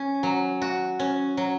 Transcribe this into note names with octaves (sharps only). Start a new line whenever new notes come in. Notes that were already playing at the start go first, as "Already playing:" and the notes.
Already playing: C#4
F#3
F#4
C#4
F#3